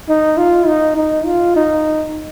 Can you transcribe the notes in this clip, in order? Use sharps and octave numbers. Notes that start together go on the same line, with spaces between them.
D#4
F4
D#4
D#4
F4
D#4